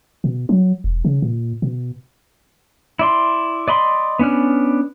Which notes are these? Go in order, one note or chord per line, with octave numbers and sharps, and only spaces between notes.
B2
F#3
E1
C#3
A#2
B2
E4 D5 C6
D5 D#5 B5 C6
B3 C#4 D4 F6